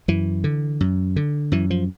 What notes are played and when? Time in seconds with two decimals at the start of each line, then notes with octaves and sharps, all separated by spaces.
0.08 F#2 E3
0.44 D3
0.81 F#2
1.16 D3
1.52 F#2 E3
1.70 F3